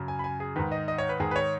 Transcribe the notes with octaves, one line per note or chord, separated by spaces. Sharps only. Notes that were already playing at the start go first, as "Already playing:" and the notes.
Already playing: F#2 C#3
G#5
B5
G#5
G#4
G#2 D#3 B4
D#5
D#5
C#5
B4
G#2 D#3 G#4
B4
C#5